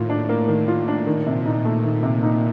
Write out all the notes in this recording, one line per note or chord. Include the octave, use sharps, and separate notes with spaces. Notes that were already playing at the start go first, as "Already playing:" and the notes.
Already playing: A2 D#3 A#3 F4
D4
A#3
D#3
F4
D4
A#2 D#3
C3
D#4
A3
D#3
C3
D#4